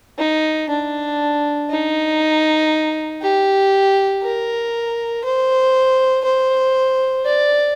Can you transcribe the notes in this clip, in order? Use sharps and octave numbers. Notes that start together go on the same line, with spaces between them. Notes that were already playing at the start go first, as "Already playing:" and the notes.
D#4
D4
D#4
G4
A#4
C5
C5
D5